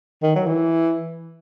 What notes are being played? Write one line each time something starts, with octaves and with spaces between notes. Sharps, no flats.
D#3
F#3
E3